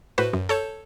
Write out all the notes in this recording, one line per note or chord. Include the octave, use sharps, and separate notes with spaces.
A2 F#4 B4 C5
F#2
A4 C#5 A5 G6